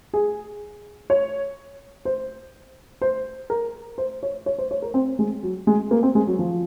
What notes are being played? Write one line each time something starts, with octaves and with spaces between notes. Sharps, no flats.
G#4
C#5
C5
C5
A#4
C5
C#5
C#5
C5
C#5
A#4
C4
G#3
F#3
G#3
A#3
C4
G#3
F#3
F3